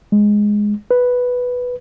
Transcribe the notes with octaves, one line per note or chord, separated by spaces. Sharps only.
G#3
B4